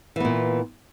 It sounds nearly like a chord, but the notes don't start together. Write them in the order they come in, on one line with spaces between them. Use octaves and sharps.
E3 B3 A#2